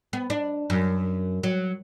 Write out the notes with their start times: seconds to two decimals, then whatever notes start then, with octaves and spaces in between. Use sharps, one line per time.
0.13 B3
0.30 D4
0.70 F#2
1.43 F#3